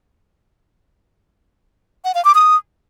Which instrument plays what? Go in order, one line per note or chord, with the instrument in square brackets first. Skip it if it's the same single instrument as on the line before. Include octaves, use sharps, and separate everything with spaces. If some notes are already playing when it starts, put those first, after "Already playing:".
[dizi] F#5
F5
D6
D#6